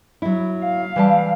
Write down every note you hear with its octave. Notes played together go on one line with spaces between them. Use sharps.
F#3 E4
F5
E3 G3 A5